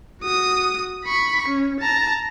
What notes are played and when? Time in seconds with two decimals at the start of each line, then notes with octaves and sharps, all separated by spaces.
0.22 F#4 D#6
1.04 B5 C#6
1.48 C#4
1.80 A5 A#5